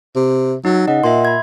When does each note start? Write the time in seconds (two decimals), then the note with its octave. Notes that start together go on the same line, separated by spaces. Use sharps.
0.16 C3
0.65 F#3 D#4
0.87 C#3 D#5 F#5
1.04 A#2 E5 C6
1.25 B5 G#6